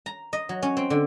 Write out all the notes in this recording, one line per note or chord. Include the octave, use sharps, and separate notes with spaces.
A#5
D#5
F#3
C#4
C4
D3